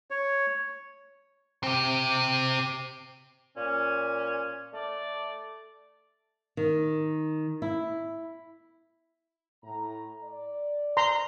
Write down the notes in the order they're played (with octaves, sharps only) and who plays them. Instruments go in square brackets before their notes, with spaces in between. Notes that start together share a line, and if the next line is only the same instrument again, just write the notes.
[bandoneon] C#5
[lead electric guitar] C4 G4
[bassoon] A#2 [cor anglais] C#4
[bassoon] A3 [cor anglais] D5
[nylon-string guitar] D#3
E4
[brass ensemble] A2 A#5
D5
[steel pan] A#5 C6